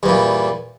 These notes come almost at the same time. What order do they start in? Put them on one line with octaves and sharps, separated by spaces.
G2 E2 A#2